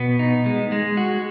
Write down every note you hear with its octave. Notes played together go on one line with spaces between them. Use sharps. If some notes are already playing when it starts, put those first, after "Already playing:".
Already playing: B2 B3
D#4
G#3
G#3
F#4